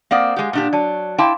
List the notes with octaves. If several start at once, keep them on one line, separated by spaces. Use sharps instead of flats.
A#3 C4 D5 F5 F#5 D#6
G#3 G4
A#2 D4 G4
F#3 D5 A5
E4 F5 G5 A5 C6 D6